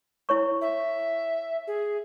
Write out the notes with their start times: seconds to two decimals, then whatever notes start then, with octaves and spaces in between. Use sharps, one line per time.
0.29 E4 C#5 C#6
0.61 E5
1.67 G#4